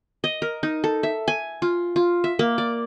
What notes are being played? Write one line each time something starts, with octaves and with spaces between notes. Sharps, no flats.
D#5
A#4
D#4
A4
E5
G#5
F4
F4
E5
A#3
D5